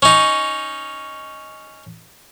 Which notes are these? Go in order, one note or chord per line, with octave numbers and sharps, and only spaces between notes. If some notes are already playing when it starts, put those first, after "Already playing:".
C#4 D#4